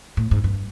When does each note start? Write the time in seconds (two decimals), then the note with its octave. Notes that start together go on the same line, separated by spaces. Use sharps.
0.17 A2
0.31 G#2
0.44 G2